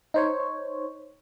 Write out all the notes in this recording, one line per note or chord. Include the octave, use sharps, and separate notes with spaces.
D#4 C5 C#5